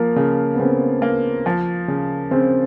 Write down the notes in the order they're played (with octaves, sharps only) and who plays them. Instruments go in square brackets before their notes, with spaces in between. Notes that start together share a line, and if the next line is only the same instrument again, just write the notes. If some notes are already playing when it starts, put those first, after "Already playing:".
Already playing: [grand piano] F3 [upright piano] A#3
[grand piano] C#3
[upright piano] B3
[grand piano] C#3 [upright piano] C4
[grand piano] A#3
F3
C#3
[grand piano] C#3 [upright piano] C4